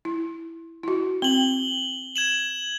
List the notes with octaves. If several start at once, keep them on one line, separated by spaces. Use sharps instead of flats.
E4
E4 F#4
C4 F#7 G7
G#6 E7 F#7